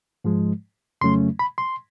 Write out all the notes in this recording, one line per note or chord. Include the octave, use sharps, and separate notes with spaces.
G#2 F3 G#3
F2 C#3 F#3 A3 C#4 C6
B5
C6